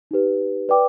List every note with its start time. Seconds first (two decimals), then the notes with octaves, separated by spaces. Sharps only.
0.11 D#4 G4 B4
0.69 B4 D5 G5 D6